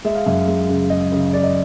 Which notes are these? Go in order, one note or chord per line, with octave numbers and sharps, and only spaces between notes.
G#3 E5
F5
F#2 E5
G#3
C#3
G#3 D#5
C#3
C#3 D5
D#5